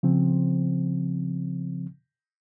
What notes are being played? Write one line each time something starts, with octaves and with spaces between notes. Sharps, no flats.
C#3 F3 C4